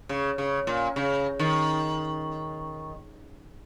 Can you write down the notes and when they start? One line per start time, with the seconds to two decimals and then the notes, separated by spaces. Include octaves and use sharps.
0.09 C#3
0.38 C#3
0.67 A#2
0.96 C#3
1.39 D#3